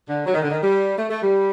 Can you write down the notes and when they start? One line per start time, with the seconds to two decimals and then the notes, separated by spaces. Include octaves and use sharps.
0.08 D3
0.26 F#3
0.34 D#3
0.42 D3
0.51 D#3
0.62 G3
0.97 A3
1.09 A3
1.21 G3